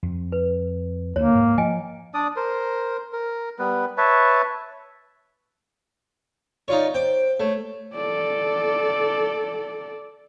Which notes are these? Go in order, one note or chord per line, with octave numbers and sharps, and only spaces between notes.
F2
B4
D2 A#3 C#5
G#2
F3 D#5 G5 G#5
D4 D5 D#6
A#4 C5
A#4
G3 B3 B4
B4 C#5 E5 A5
D#4 F4 C#5 D5
C5 G5 D6
A3 C#5
A4 D5